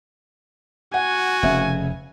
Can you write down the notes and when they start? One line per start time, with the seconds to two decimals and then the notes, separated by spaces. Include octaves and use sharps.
0.94 F#4 F#5 G#5
1.43 F1 C#3 E5